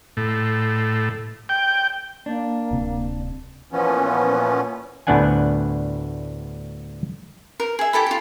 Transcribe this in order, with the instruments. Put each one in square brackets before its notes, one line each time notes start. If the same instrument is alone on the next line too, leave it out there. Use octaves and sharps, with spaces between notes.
[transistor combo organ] A2
G5
[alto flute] A#3 [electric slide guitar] D4
[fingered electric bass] D1 C3 C4
[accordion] A#2 E3 F3 B3 C#4
[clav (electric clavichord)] D2 A2 B3 D4 F#5 G#5
[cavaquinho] A#4
G#4 E5
E4 G4 A4 B5
F4 G4